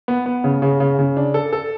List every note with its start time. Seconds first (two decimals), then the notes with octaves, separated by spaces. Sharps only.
0.08 B3
0.26 B3
0.44 C#3
0.62 C#3
0.80 C#3
0.99 C#3
1.17 D4
1.34 A4
1.53 A4